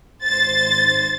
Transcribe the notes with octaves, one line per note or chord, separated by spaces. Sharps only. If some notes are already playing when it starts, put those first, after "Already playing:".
G#1 C5 A6